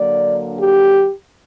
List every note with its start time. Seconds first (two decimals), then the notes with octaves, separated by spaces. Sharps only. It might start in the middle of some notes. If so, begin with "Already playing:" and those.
Already playing: D3 F#3 A#3 D4 D5
0.59 G4